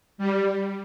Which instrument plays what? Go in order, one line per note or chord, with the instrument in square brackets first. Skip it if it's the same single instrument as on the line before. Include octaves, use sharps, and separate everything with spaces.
[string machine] G3